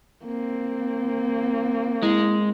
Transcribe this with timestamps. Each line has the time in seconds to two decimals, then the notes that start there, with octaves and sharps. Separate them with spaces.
0.24 A#3 C4
2.02 G#3 E4